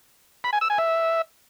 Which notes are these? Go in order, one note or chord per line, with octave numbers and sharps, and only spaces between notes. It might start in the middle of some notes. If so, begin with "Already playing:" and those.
B5
G#5
E6
G#5
E5